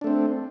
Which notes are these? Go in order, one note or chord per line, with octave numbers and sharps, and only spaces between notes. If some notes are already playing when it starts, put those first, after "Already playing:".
A3 C4 D4